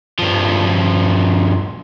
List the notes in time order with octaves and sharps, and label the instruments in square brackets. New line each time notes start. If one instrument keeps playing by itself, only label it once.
[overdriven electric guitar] G2 F3